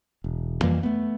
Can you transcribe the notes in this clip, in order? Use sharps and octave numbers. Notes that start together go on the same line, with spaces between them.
E1
F2 E3 G3 A#3
A3 B3